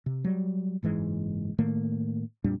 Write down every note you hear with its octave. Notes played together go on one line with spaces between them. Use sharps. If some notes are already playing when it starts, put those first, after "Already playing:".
C3
F#3 G3
F#1 G#2 E3 G#3
A2 D#3 A3 A#3
F2 A#2 G3 D4